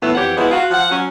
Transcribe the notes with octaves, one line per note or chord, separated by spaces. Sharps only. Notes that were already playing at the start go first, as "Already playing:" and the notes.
A2 E3 F#3 B3 E4
F2 E3 G4 C#5 F#5
F3 G#3 B3 E4 F#4
F4 F#4
F3 F#5
F#3 C#4